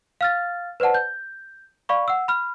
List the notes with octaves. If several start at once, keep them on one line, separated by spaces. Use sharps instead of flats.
F5 F6 A6
B4 C5 D5 F#5 A5
G6
D5 F5 B5 C#6
F#5 E6
B5 F6